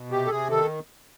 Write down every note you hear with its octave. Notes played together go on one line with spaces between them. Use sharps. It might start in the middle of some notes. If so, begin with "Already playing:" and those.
Already playing: B2
C3 G4
A4
C3 G#4
D#3 A4